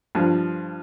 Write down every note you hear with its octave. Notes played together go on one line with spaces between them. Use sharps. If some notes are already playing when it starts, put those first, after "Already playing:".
G2 F3